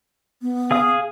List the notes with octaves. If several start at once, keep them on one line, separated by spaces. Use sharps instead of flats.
B3
G#4 F5 D#6